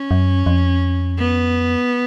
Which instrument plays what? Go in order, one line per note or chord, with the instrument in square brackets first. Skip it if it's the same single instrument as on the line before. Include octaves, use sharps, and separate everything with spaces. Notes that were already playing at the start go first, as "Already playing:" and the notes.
Already playing: [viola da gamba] C#4
[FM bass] F#2
F2
[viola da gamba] B3